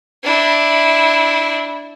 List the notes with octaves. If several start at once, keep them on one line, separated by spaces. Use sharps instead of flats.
D4 E4